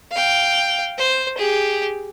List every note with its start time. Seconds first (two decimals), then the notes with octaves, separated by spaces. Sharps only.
0.12 F5 G5
0.98 C5
1.38 G4 G#4